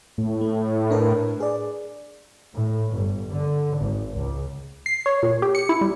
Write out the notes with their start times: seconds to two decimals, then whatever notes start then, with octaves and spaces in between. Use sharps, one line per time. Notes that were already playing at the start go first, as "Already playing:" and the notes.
0.18 A2
0.41 A3
0.90 D4 A#4 B4
1.40 G#4 D5
2.52 A2
2.92 G1
3.30 D3
3.77 G#1
4.15 C#2
4.86 C7
5.06 C#5
5.23 A#2
5.42 G4
5.55 C#7
5.69 E4
5.81 G3